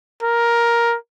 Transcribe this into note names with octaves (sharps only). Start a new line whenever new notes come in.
A#4